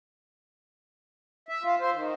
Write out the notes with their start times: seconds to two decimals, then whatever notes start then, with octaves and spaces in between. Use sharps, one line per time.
1.49 E5
1.63 F4
1.80 C5
1.93 D#3